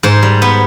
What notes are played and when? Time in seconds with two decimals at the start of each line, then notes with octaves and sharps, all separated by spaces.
0.03 G#2 C5
0.23 G3
0.42 B3